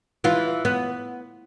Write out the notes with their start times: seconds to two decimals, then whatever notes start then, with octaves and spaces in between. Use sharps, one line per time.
0.24 E3 F4
0.65 B3